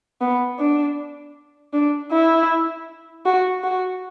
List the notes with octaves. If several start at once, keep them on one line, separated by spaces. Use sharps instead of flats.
B3
D4
D4
E4
F#4
F#4